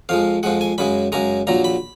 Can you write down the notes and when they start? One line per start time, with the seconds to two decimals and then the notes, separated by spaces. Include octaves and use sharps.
0.09 F2 F3 G#3 F5
0.43 F2 F3 G#3 F#5
0.61 G#5
0.78 F#2 C#3 G#3 B5
1.12 F#2 C#3 G#3 A#5
1.47 A#1 A#2 F#3 A#5
1.64 B5